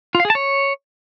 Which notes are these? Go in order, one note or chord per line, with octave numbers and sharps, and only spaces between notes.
F4
F5
G#4
A5
C#5